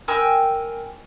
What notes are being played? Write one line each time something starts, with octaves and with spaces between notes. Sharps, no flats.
A#4 G5 G#5 E6